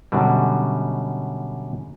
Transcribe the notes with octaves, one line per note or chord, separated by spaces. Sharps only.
F#2 B2 D3 G3